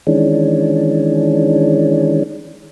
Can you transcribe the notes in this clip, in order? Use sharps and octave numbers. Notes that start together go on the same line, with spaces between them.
D#3 E3 G#3 C#4 D4